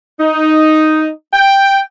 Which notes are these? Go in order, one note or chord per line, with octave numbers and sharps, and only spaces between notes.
D#4
G5